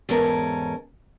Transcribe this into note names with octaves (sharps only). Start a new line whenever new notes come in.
E2 G#2 C#4 A4 A#4